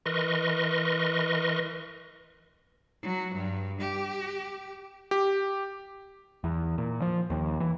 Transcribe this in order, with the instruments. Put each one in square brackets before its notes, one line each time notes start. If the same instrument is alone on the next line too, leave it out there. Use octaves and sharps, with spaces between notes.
[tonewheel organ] E3 A#4 B4 D#5 C6 C#6
[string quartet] F#3
G2
G4
[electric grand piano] G4
[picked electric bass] E2
A#2
F3
D#2
E3